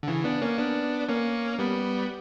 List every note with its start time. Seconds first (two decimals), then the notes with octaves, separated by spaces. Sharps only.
0.03 D3
0.08 C#3 E3
0.24 B3 D4
0.42 A#3 C#4
0.58 B3 D4
1.09 A#3 C#4
1.59 G3 B3